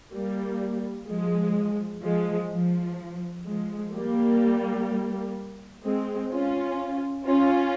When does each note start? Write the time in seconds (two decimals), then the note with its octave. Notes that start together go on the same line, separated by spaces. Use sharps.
0.13 G3 A#3
1.08 F3 G#3
2.02 F3 G#3
2.51 F3
3.46 F3 G#3
3.93 G3 A#3
5.84 G#3 C4
6.31 C#4 F4
7.26 C#4 F4